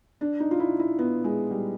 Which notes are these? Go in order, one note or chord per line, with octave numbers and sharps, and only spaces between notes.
D4
D#4
F4
E4
E4
B3
G#3
G3